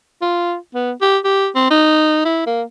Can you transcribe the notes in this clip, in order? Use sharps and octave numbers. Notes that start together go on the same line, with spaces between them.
F4
B3
G4
G4
C4
D#4
E4
A#3